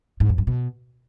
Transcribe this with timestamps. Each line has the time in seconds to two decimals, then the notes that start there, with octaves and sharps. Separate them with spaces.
0.20 G#2
0.29 F2
0.38 G2
0.47 B2